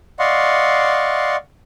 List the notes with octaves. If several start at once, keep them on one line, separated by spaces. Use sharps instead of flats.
D5 D#5 F5 F#5 C6 C#6